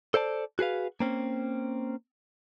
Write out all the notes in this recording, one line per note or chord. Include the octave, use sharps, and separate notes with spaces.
A4 C5 D5 A5
F#4 G#4 B4 F5
A#3 C4 C#4